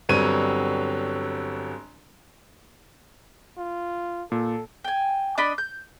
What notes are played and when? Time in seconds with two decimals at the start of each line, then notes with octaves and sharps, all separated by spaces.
0.09 G1 F#3 G3 C4 C#5 D#7
3.58 F4
4.32 A#2 A4
4.84 G5 G#5
5.38 D4 D5 D#5 B5
5.58 G6